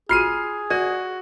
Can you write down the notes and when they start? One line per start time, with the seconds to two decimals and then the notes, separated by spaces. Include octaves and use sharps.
0.09 F4 F#4 G#4 F6 C7 D#7
0.70 F#4 A#4 D5